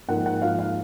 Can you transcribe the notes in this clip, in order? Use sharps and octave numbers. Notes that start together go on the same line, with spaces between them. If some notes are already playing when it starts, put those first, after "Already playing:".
G#2 F3 A#3 F#5
F#5
G#2 F3 A#3 F5
F5